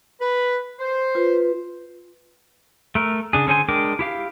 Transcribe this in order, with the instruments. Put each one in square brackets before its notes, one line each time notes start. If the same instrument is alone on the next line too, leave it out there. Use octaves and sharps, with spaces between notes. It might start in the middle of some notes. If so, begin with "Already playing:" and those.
[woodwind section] B4 B5
C5
[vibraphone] F4 B4
[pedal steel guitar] A3 A#4
C#3 D4 G#4
D3 C#4 G#4 C5 G#5
G#3 D4 A#4 G5 D6
E4 G4 F5